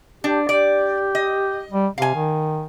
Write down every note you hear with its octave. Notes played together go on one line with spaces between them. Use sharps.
D4 G4
G4 D5
D#5
G3
C3 F5 G#5
D#3